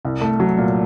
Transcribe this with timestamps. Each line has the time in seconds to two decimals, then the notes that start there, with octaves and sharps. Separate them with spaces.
0.05 C2
0.21 A3
0.40 F#3
0.58 A#2